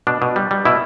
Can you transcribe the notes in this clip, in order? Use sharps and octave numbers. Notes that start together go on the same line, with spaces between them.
B2 D4
B2
G3
G3
B2 E4